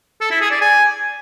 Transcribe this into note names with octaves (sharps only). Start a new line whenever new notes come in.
A4
E4
G#4
D5
G#5